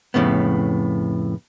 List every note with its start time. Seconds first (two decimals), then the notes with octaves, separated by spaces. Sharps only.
0.14 F2 A2 C#3 B3